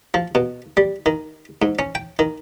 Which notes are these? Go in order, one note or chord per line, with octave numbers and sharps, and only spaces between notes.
F3
B2
G3
D#3
G#2
C#4
G5
D#3